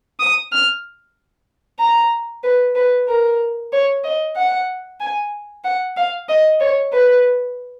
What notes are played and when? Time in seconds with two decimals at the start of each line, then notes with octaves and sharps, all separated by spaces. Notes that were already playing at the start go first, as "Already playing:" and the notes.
0.20 D#6
0.52 F6
1.79 A#5
2.44 B4
2.75 B4
3.08 A#4
3.73 C#5
4.04 D#5
4.36 F#5
5.00 G#5
5.64 F#5
5.97 F5
6.29 D#5
6.60 C#5
6.93 B4